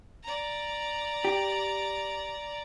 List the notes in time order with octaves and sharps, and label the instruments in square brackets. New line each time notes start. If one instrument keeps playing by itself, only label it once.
[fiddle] D5 A#5
[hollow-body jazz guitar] G4